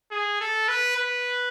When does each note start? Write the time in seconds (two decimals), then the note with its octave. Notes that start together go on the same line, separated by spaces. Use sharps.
0.11 G#4
0.41 A4
0.68 B4
0.97 B4